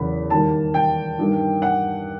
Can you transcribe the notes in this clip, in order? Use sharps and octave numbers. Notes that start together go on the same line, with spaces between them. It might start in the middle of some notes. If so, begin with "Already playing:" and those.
Already playing: E2 C#3 F#3 A#3 B5
D#2 D#3 G3 A#3 A5
G5
G2 D#3 G3 A#3
F#5